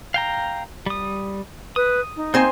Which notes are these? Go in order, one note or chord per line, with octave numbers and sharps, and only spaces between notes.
F5 G5 A#5
G3 D#6
B4 D#6
D#4
A#3 C4 C5 G#5 G6